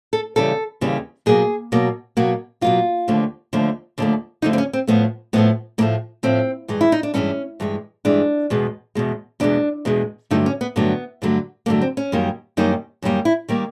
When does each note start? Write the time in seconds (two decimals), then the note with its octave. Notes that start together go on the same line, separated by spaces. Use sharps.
0.13 A4
0.36 D#2 C#3 E3 G3 A4
0.81 D#2 C#3 E3 G3
1.26 B2 F#3 A#3 G#4
1.72 B2 F#3 A#3
2.17 B2 F#3 A#3 F#4
2.61 B2 F#3 A#3 F4
3.08 D#2 D3 F3 A3
3.53 D#2 D3 F3 A3
3.98 D#2 D3 F3 A3
4.42 D#2 D3 F3 A3 D#4
4.53 C4
4.58 C#4
4.73 C4
4.87 A2 F3 A3 B3
5.33 A2 F3 A3 B3
5.78 A2 F3 A3 A#3
6.23 A2 F3 A3 C4
6.68 G2 E3 G#3
6.81 E4
6.92 D#4
7.03 D4
7.14 G2 E3 G#3 C#4
7.60 G2 E3 G#3
8.05 G2 E3 G#3 D4
8.50 E2 B2 G#3
8.95 E2 B2 G#3
9.40 E2 B2 G#3 D4
9.85 E2 B2 G#3
10.31 G2 D3 F#3 A3 D#4
10.46 C#4
10.61 B3
10.76 G2 D3 F#3 A3 B3
11.22 G2 D3 F#3 A3
11.66 G2 D3 F#3 A3 A#3
11.82 C4
11.97 C#4
12.12 F#2 D#3 G3 A#3
12.57 F#2 D#3 G3 A#3 D#4
13.02 F#2 D#3 G3 A#3
13.25 E4
13.48 D#3 G3 A#3